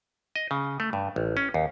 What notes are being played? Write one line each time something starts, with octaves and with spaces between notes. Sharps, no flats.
D#5
C#3
A3
G2
A1
C#4
D#2